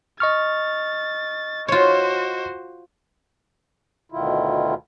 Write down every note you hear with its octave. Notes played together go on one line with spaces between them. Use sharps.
D#5 C#6 F6 A6
F4 F#4 C5 C#5
D2 B2 D#3 E4 F4